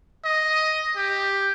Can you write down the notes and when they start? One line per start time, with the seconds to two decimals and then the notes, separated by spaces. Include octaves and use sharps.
0.25 D#5
0.97 G4